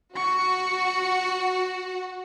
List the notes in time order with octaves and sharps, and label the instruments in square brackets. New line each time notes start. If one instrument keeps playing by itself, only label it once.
[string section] F#4 [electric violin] C#6